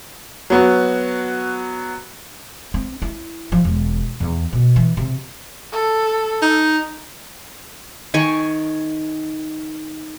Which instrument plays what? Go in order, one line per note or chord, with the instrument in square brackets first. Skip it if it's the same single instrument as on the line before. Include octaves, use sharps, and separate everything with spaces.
[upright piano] F#3 B3 F#4
[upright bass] C4
E4
F3
E1
E2
B2
E3
C3
[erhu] A4
[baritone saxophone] D#4
[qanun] D#3 G#5 C#6